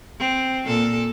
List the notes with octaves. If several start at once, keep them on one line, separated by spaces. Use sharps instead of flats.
C4
A#2 A4